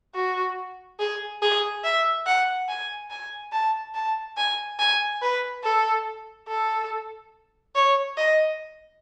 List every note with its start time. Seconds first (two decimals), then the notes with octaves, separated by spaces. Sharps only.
0.15 F#4
0.99 G#4
1.42 G#4
1.84 E5
2.26 F#5
2.68 G#5
3.10 G#5
3.52 A5
3.95 A5
4.37 G#5
4.79 G#5
5.22 B4
5.64 A4
6.48 A4
7.75 C#5
8.17 D#5